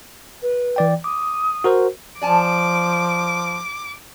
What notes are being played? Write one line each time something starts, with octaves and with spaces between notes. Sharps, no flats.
B4
E3 D5 G5
D6 D#6
F#4 A#4 C5
F3 D5 G#5 A5 D6